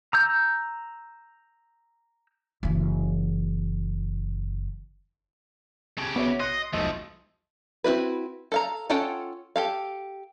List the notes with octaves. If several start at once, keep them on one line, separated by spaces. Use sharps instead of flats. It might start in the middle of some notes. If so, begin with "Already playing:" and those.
A#5 E6 G6
F#1 E3
C#3 G4 A5 G#6
B3 F#4 C#5 E5
D#5 C6 F#6 A#6 C#7
E1 B1 F3 A3 D#5
C4 E4 F#4 B4
A4 F5 A#5
C#4 F4 A4 F#5 G5
G4 A4 F5